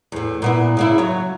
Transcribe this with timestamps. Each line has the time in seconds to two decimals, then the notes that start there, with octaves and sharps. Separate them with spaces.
0.12 E2 A2
0.42 A#2 B3 E4
0.77 C#3 A#3 E4
0.98 F#3 C#5